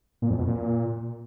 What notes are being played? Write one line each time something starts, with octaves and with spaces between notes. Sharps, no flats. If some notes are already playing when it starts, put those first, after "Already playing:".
A#2
F2
B2
A#2